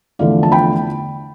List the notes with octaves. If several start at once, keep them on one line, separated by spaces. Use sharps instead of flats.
E2 D3 F3 A3 E4 D5 F5
A5
G5 B5